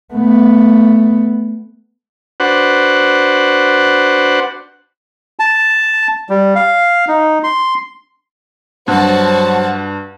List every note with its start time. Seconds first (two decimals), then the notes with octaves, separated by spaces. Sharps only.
0.14 A3 B3
2.40 D4 F#4 B4 C5 F#5
5.39 A5
6.30 G3
6.55 F5
7.08 D#4
7.44 C6
8.88 G2 F#3 F#4 C5 A5